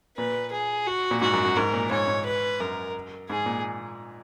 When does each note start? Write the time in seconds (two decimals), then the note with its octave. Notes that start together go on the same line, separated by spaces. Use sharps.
0.17 A#2 B4
0.52 G#4
0.86 F#4
1.11 A#2
1.22 G#2 F#4
1.33 F#2
1.44 F#2
1.56 G#2 A#4
1.74 A#2
1.91 G#2 C#5
2.08 G#2
2.26 B4
2.60 F#2 A#4
3.30 G#2 G#4
3.46 A#2